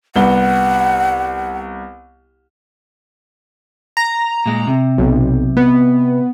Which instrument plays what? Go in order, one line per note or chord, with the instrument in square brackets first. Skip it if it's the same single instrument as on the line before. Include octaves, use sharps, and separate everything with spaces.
[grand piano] C2 B3 G7 [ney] F#5
[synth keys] A#5
[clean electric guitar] A#2 G#3
C3
[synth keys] B1
B3